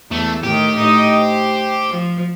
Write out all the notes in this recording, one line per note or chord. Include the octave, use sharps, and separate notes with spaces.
E2 A3
A2 D#3 G4
A2 D#4 D#5
C5
F3